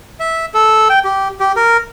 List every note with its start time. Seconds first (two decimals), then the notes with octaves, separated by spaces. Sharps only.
0.20 E5
0.54 A4
0.90 G5
1.05 G4
1.40 G4
1.56 A#4